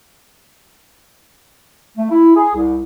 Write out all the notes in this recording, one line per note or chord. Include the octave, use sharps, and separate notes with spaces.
A3
E4
G#4
C2